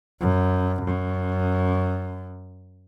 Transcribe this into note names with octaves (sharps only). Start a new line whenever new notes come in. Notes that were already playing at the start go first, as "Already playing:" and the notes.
F#2
F#2